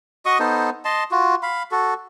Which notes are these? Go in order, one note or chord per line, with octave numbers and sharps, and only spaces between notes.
F#4 D#5 C#6 D#6
B3 D#4 A4 C5
D#5 A5 C6
F4 F#4
F5 B5
F#4 A4